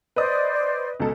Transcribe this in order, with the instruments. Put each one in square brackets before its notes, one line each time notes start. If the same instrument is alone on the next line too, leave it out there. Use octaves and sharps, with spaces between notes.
[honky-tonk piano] B4 D#5 D#6 [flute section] C5 D5
[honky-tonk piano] C#2 B2 A4